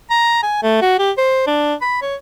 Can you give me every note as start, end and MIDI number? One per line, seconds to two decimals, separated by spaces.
0.11 0.40 82
0.43 0.63 80
0.63 0.80 57
0.82 0.97 66
0.99 1.11 67
1.18 1.47 72
1.47 1.74 62
1.81 2.01 83
2.02 2.15 73